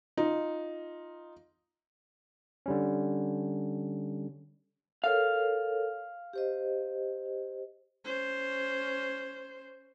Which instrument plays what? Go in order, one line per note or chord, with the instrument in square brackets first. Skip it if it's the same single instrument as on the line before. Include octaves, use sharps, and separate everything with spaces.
[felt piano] D#4 F4
[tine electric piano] D3 G3 C#4
[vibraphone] A4 A#4 C#5 [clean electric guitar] F5
[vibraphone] G4 C5 D#5
[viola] C#4 C5